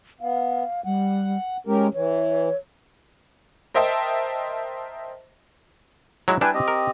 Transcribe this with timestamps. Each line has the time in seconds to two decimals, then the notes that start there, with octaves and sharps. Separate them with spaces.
0.21 B3 F5
0.85 G3 F#5
1.67 G#3 C#4 G4 A#4
1.94 E3 C#5
3.74 A#4 C5 D#5 E5 G5 A5
6.28 F#3 G#3 E4
6.41 G3 D4 E4 B4 G5 G#5
6.54 C4 G4 D#5
6.68 A#4